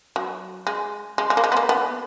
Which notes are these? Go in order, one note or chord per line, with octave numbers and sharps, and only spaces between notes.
F#3
G#3
G#3
G#3
A#3
G#3
B3
A#3
B3